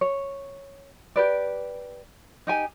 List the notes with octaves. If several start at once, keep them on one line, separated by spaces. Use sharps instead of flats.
C#5
G4 B4 D5
D#4 G4 G#5